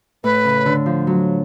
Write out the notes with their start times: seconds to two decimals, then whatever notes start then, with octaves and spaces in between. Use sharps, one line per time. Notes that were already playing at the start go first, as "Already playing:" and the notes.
0.24 A2 B4
0.45 C#3
0.66 D3
0.86 F3
1.07 F#3